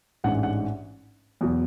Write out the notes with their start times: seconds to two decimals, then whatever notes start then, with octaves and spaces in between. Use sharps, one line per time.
0.24 A1 G#2 G#3 D4 F#5
0.43 F#5
1.41 E2 B2 F#3